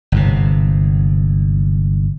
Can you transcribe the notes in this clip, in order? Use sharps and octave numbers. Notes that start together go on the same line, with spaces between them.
G1 G#2 C3